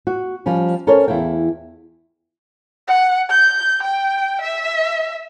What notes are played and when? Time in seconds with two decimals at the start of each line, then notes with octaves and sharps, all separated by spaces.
0.07 F#4
0.46 F3 G3 C#4
0.87 C#4 A4 A#4 C5 C#5
1.08 E2 E4 F5 G5
2.88 F#5
3.30 G6
3.83 G5
4.42 E5